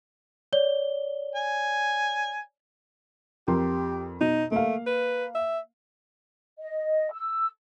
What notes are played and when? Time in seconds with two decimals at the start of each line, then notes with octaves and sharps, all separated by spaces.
0.53 C#5 D5 G7
1.36 G#5
3.48 F2 G4 A#4 C6
4.21 B2 D#4
4.52 A3 A#3 F5
4.87 B4
5.35 E5
6.59 D#5
7.12 E6